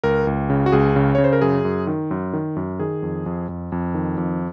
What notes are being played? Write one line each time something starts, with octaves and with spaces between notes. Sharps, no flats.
C#2 A#4
C#2
C#3
F#4
C#2 G#4
C#3
C#3 C#5
C5
A#4
F#2 G#4
F#2
D#3
F#2
D#3
F#2
D#3 G#4
F2
F2
F2
F2
D#3
F2